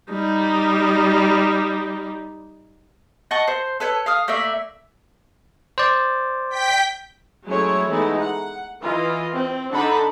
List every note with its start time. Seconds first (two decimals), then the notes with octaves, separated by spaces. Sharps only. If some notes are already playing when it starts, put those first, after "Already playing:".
0.10 G3 D#4
3.31 D#5 F#5 A5 C#6
3.48 C5
3.80 A4 B4 C#5
4.06 F5 D#6 F6
4.28 A3 A#3 D5 E5
5.78 C5 D5
6.49 G5 B6
7.47 F#3 G#3 A3 C#4 E4 C#5
7.90 E3 G#3 A3 B3 D#4 E4
8.19 F#5
8.80 E3 F4 D#5
9.35 C4
9.71 D3 D4 D#4 A4 F#5 B5